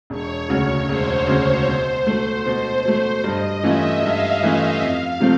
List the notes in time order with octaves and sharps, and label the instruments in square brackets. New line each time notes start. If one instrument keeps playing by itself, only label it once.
[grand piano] E1 [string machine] C#5
[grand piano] D2 C#3 F#3
[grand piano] E1 [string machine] C5
[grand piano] D2 C#3 F#3
B2
F#3 A3
B2
F#3 A3
[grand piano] G2 [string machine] D#5
[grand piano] E3 A3 C#4 F4 [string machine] E5
[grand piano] G2 [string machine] F5
[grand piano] E3 A3 C#4 F4
[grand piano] F2 [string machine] F5
[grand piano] C3 F3 A3 C4